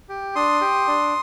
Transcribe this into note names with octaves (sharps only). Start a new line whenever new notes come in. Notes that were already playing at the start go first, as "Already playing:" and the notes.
G4
D4 C6 D#6
G4
D4